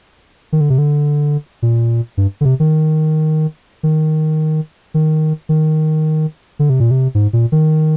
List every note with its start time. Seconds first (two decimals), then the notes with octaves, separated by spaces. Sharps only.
0.52 D#3
0.61 D3
0.70 C3
0.78 D3
1.62 A#2
2.17 G2
2.41 D3
2.45 C3
2.60 D#3
3.83 D#3
4.94 D#3
5.49 D#3
6.59 D3
6.70 C3
6.80 A#2
6.91 C3
7.15 G#2
7.33 A#2
7.52 D#3